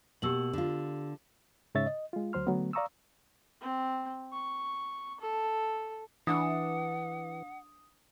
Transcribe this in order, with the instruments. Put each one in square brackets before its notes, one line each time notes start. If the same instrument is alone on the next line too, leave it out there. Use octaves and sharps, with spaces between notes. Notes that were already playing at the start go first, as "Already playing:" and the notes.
[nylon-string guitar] B2 A#3 [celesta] G4 E6 F#7
[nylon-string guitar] D3 F4
[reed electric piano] G#2 C#3 C#5 E5 A6
D#5
G#3 F4
D2 F#3 C5 C6 F6
D3 F#3 A3 B3
D5 F5 A#5 C#6 D#6 E6
[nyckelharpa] C4
C#6
A4
[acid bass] E3 [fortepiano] D4 [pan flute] F#5 [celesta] D#6